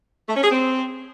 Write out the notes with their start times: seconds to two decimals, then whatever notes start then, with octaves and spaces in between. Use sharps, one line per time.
0.28 A3
0.36 C#4
0.44 G#4
0.51 C4